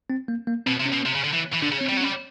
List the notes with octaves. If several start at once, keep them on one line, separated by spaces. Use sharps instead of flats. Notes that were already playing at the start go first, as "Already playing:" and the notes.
C4
A#3
A#3
B2 C4
C3
C#4
B2
C3
C#3
D3
E3
E3
D3 D4
C#3
C4
G3
C4
F#3
C#4
G3